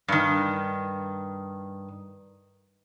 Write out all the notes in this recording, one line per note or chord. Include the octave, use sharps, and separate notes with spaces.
G2 D#3